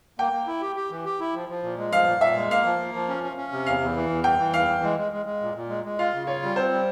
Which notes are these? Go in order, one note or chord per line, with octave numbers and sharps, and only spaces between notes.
A#3 G5
A#3
E4
G4
G4
E3
G4
E4
F3
F3
A#2
G#3
F3 F5
A#2
A#2 E5
G#3
A#3 F5
F3
A#3
F3
C#4
C#4
C#4
C3
E2 F5
E2
E3
E2
E3 G5
E3
E2 F5
E3
G#3
G#3
G#3
G#3
A#2
A#2
G#3
G#3
F4 F5
C#3
F4 C#5
G3
C4 C5
G3